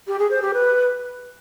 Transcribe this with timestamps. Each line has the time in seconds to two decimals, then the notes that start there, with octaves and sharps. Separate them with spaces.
0.07 G4
0.19 G#4
0.30 C5
0.42 G4
0.54 B4